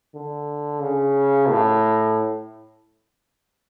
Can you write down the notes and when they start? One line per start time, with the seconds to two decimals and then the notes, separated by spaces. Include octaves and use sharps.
0.15 D3
0.82 C#3
1.49 A2